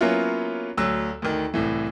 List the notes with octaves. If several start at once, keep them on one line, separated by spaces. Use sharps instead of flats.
F#3 A#3 B3 C#4 E4 F4
D2 F#3 E6
D2 D#3
C2 A2 E3